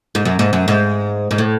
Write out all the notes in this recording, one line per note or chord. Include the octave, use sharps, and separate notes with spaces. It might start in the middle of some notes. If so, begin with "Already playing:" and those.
G#2
F#2
G#2
F#2
G#2
G#2
A2